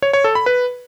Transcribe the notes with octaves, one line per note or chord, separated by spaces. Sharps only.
C#5
C#5
A4
B5
B4